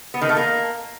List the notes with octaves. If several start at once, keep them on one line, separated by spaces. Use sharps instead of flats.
B3
D#3
A3
A#3